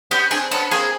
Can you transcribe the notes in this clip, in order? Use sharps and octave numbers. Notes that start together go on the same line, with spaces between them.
B3 C#4 G4
C4 D4 G#4
B3 C#4 A4
A#3 C4 G#4